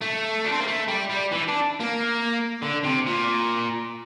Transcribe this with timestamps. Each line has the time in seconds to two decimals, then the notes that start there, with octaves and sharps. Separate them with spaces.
0.02 A3
0.45 D4
0.52 C4
0.60 A#3
0.67 A3
0.88 G3
1.09 G3
1.32 E3
1.48 D4
1.80 A#3
2.62 D3
2.84 C3
3.07 A#2